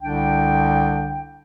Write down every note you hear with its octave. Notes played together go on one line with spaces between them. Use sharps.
C2 D3 D4 G5